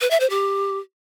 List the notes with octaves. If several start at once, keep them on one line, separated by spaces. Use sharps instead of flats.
B4
E5
C5
G4